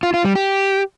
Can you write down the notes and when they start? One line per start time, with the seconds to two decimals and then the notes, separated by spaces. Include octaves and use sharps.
0.03 F4
0.14 F4
0.25 G3
0.35 G4